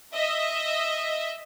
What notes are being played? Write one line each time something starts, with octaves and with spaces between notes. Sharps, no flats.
D#5 E5